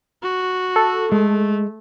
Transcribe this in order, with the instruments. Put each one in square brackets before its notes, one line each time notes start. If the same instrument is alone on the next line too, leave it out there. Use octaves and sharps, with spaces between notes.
[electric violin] F#4
[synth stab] A4
[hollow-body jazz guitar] G#3 [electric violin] A3